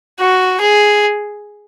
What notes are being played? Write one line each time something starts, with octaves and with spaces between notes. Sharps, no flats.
F#4
G#4